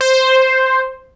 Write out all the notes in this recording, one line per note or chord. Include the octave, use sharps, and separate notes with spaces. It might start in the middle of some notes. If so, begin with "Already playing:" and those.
C5